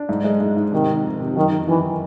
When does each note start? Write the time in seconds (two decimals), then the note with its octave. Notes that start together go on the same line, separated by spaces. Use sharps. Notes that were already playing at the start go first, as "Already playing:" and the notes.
Already playing: D4
0.09 G#2
0.24 G#3
0.40 G#2
0.56 G#2
0.72 C3 D#3
0.88 C3
1.04 F2
1.20 C3
1.36 F#2 D#3
1.53 D#3
1.68 D#3 E3